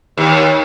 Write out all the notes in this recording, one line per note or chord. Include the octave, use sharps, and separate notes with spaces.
D#2